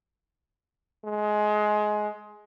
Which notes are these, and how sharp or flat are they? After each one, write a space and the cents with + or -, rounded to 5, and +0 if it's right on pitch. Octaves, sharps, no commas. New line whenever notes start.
G#3 +20